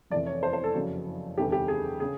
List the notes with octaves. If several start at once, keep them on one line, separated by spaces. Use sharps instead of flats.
F1 E2 C3 D5
C#5
C5
C5
A4
F#1 F2 C#3 F#3
E1 D2 C3 D#3 G4
G4
G#4
C#3 G#4